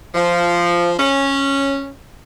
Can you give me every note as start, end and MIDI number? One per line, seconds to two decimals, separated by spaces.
0.15 0.92 53
0.98 1.90 61